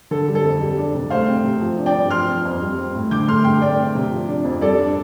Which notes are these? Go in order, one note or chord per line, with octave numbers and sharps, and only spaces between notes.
D3 A4
G3
A4
F2
G3
D4
C3
A3 C5 F5
C4
C3
F3
D4
D5 G5
G2
F3 C6 F6
C4
F2
G3
C4
A2
D3 D6 G6
A3 C6 F6
G2 G5 C6
A3 D5 G5
C4
C3
F3
D4
F2
G3 A4 D5
D4